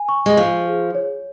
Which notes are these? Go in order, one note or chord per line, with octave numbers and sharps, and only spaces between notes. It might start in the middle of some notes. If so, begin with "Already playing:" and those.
Already playing: G#5
C#6
G#3
F3 C#6
G#4
C#5